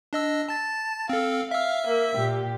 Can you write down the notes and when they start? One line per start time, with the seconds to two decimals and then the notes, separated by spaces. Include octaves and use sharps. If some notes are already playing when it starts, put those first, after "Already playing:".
0.13 D4 D#5 E6
0.49 A5 A6
1.09 C4 A4 F5
1.51 E5 F5 E6
1.87 A#3
2.16 A#2 G4